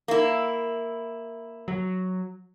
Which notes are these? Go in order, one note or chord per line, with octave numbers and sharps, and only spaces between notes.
A#3 E4
F#3